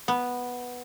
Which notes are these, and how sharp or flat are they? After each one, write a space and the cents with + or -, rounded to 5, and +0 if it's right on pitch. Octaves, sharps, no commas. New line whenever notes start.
B3 -5